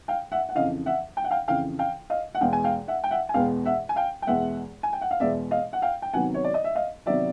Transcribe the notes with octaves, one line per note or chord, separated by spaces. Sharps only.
F5 G5
E5 F#5
F#5
F2 C#3 E3 D#5 F5
E5 F#5
G5
F#5
F5 G5
F2 C#3 E3 F5 G5
F5 G5
D#5 F5
F#5
E2 B2 G#3 B3 F5 G5
G#5
F5 G5
E5 F#5
G5
E5 F#5
G#5
E2 B2 G#3 B3 F5 G5
E5 F#5
G#5
F5 G5
G5
E2 B2 G#3 B3 E5 F#5
G#5
G5
F#5
F5
E2 B2 G#3 B3 D5 E5
D#5 F5
F#5
F5 G5
G5
C3 D#3 F#3 B3 F#5 G#5
C#5
D5
D#5
E5
D#5 F5
C3 D#3 F#3 B3 D5 E5